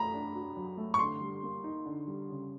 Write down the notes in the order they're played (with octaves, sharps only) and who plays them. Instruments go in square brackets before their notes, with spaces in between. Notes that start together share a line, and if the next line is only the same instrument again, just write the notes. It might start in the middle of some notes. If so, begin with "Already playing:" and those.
Already playing: [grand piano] A3 [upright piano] A#5 B5
[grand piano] D4
F#4
F#3
A3
[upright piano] C#6
[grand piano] D3 [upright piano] C6
[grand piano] G3
A#3
D#4
D3
G3
C#3